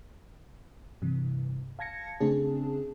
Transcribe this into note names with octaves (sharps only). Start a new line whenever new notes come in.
G2 C3 E3
F5 A5 G#6 A#6 C#7
C#3 A3 C4 D4 G#4 A5